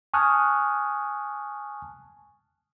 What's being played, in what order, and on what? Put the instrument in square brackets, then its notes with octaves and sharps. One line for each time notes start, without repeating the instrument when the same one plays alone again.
[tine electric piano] G#5 A5 C#6 D#6 F6 F#6